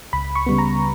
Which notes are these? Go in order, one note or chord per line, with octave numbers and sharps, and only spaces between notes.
C#2 B5
C#6
C#3 G3 B3
A#5